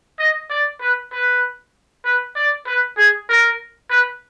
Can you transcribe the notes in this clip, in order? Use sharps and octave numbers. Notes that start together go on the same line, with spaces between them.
D#5
D5
B4
B4
B4
D5
B4
G#4
A#4
B4